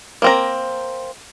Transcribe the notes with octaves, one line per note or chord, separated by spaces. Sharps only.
A#3 C4 A#5